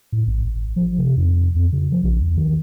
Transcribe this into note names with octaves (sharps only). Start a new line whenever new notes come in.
A2
A1
G#1
F3
C3
F2
F2
C#3
F3
A#1
E2
D#3